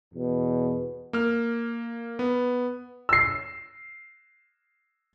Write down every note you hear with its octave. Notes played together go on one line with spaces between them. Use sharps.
E2 B2
A#3 F6
B3
E6 C7